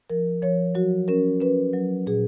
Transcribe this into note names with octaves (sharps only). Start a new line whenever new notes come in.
F3 A#4
F3 C#5
F#3 F#4
C#4 A#4
C#4 B4
F#3
A#2 G#4